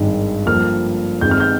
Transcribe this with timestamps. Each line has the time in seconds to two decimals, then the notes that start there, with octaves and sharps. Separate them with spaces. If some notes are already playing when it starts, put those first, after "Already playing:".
Already playing: G#1 G2 D#3 G#3
0.46 G2 D3 F3 A#3 F6
1.21 G1 G2 D#3 G#3 C4 G6
1.31 F6
1.40 G6